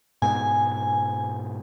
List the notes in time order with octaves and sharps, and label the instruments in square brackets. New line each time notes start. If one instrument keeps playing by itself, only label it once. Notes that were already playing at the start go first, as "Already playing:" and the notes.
[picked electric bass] G#2 B2 [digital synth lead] G#5